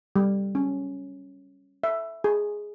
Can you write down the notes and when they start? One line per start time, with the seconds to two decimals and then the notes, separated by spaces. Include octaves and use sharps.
0.16 G3
0.55 C#4
1.84 E5
2.24 G#4